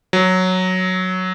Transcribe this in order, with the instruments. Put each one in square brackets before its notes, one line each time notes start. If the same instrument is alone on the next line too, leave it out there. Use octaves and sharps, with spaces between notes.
[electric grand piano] F#3